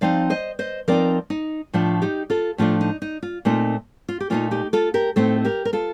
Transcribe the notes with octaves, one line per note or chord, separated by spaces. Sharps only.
F3 C4 D#4 D5 F5
C5 D#5
C5 D#5
F3 C4 D#4 A#4 D5
D#4
A2 F3 A3 D4 F4
D#4 G4
F4 A4
A2 F3 A3 D4 F4
D#4
D#4
F4
A#2 A3 C4 D#4 F4
F4
G4
A#2 A3 C4 D#4 F4
D#4 G4
F4 A4
G4 A#4
A2 A3 C4 D#4 A4 C5
G4 A#4
A#4
F4 A4